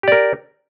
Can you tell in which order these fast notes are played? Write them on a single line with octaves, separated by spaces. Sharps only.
G4 D5 A#4